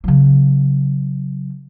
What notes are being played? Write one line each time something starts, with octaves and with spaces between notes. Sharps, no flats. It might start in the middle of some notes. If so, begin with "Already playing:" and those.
C#3 F#3